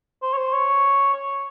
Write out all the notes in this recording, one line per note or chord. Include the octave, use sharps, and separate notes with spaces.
C5
C#5
C5
C#5
C#5